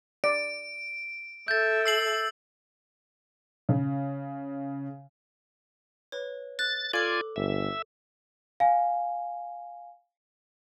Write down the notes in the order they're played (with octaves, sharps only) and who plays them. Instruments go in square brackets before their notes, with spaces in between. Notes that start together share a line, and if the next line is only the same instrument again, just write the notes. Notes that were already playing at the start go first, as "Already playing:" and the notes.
[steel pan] D5 [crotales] D7
[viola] A4 E5 [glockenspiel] G6 A6
[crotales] E6 C7 F#7
[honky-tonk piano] C#3
[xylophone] B4 C#5
[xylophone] F#6 [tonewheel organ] A6
[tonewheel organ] F4 D5 G#5 [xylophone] A4 D6
[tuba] G1 [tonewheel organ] E5
[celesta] F5 G#5